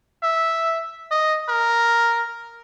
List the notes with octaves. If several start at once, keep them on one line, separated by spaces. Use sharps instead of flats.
E5
D#5
A#4